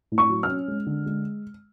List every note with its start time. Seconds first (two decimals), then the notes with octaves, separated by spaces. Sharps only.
0.12 A2
0.18 C#6
0.30 F#3
0.43 F6
0.49 C#4
0.68 G#3
0.87 D3
1.06 G#3